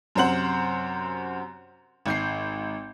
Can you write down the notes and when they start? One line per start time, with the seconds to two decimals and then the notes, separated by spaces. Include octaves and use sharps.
0.15 F#2 C3 C5 F#5 F#7
2.06 G#1 G6 C7